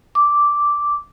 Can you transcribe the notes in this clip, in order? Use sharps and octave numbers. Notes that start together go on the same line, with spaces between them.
D6